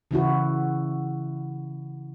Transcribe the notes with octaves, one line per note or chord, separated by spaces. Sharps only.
C#3 E3 E4 F#4